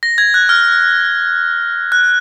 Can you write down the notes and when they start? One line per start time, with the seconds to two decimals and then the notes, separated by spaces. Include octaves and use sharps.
0.03 A#6
0.18 G#6
0.34 F#6
0.49 F6
1.92 F#6